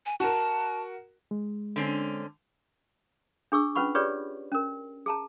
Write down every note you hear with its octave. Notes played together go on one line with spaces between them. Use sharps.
G#5
F#4 A#4 A5
G#3
D3 C4 C#4
D4 G#4 C#6 E6
C#4 F4 B4 F#5 B5 C#6
F4 G4 G#4 B4 C#5 D5
C#4 A#4
G#4 A5 A#5